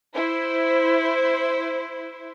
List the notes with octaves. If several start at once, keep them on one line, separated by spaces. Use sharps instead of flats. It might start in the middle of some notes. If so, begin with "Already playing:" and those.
E4 C5